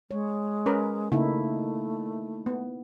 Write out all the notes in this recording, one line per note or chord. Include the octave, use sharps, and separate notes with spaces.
G#3 C#5
C#4 A#4 B4
C#3 A3 A#3 D#4 E4
B3